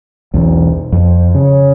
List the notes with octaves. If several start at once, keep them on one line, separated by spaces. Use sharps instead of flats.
B1 E2
F2
C#3